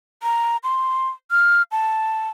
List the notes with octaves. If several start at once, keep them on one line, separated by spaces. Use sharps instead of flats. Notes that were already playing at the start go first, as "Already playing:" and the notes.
A#5
C6
F6
A5